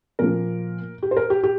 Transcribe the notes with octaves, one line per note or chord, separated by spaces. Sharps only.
A#2 F3 A#3 A#4
G4
C5
A#4
G4
G4